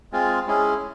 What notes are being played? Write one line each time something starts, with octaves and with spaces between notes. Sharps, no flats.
G#3 C4 F4 G#4
G#3 C#4 E4 G#4